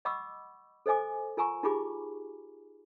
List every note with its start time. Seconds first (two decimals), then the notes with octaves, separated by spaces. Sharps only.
0.05 D#5 F#5 B5 C#6 D6 E6
0.86 A4 C5 D#5 G#5 D6
1.37 F4 A#4 G#5 A#5 C#6
1.63 D#4 F4 G4 G#4 B5 D6